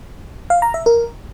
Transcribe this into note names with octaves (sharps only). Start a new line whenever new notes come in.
F5
A#5
E5
A#4